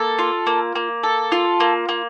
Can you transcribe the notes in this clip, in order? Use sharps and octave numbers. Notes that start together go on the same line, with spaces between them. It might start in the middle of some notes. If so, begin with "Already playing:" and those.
Already playing: A#3 A4
F4
A#3
A#3
A4
F4
A#3
A#3